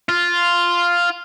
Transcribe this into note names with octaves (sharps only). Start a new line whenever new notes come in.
F4